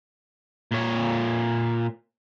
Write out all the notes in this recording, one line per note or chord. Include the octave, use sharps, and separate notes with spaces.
A#2 C#5